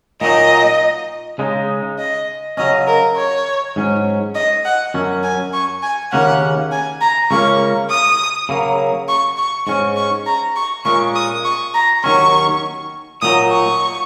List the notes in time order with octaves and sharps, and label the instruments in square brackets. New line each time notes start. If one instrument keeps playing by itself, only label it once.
[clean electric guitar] A#2 F#3 D#4 [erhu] D#5
[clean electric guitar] C#3 G#3 D#4
[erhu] D#5
[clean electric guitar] C#3 F#3 C#4 [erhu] D#5
[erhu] A#4
C#5
[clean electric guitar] G#2 F#3 C#4
[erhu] D#5
F#5
[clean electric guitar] F#2 F#3 C#4
[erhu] G#5
C#6
G#5
[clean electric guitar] D#2 C#3 A#3 C#4 [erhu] F#5
[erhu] G#5
A#5
[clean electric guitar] C#2 C#3 A#3 C#4 [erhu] C#6
[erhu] D#6
[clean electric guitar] C#3 F#3 A#3
[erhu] C#6
C#6
[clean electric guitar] G#2 G#3 C#4 [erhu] C#6
[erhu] C#6
A#5
C#6
[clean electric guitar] A#2 G#3 C#4 [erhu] C#6
[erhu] D#6
C#6
A#5
[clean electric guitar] D#2 D#3 F#3 C#4 [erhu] C#6
[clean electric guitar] A#2 F#3 D#4 [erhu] D#6
[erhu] C#6